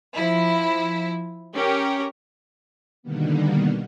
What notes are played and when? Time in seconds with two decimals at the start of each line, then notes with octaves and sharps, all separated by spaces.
0.15 F3 E4
1.53 C#4 G4 A#4
3.03 B2 D3 D#3 G3 A#3 B3